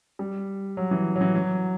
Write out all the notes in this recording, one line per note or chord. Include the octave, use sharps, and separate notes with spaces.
G3
F#3
E3
F#3
E3
F#3